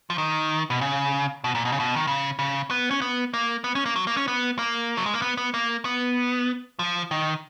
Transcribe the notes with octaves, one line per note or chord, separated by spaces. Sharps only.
F3
D#3
B2
C#3
B2
A#2
B2
C#3
B2
D#3
C#3
C#3
B3
C#4
B3
A#3
B3
C#4
A#3
F#3
A#3
C#4
B3
A#3
F#3
G#3
A#3
B3
B3
A#3
B3
F3
D#3